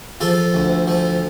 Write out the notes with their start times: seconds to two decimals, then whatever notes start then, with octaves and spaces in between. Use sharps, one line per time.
0.20 F3 F4 A4
0.54 D2
0.88 F3